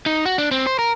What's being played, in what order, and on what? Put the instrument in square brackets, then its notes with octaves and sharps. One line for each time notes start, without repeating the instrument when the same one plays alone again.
[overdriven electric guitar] D#4
F#4
D4
C4
C5
A#4